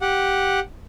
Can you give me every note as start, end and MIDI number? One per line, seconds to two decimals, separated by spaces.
0.01 0.60 67
0.01 0.60 78